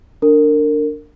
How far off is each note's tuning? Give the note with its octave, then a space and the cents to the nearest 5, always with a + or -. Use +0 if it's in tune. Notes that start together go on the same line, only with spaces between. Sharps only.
D4 +0 A#4 -25